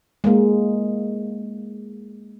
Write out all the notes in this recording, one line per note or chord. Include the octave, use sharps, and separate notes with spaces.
G#3 A#3